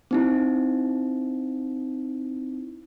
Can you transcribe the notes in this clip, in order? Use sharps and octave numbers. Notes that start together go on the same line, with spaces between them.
C4 D#4 E4